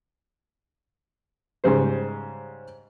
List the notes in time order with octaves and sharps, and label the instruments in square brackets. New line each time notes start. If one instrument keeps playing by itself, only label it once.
[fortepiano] G#2 C#3 G3 C5